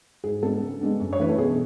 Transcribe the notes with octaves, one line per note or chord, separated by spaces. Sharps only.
G#2 G#4
G#3 B3 D4 A4
C#3
G#3 B3 D4
F#2
C#5
E3 A3 D4 B4
A4
B2 G#4